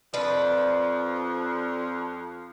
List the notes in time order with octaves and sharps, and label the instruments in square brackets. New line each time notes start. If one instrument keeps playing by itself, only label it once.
[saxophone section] F2 F3 [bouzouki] D4 B4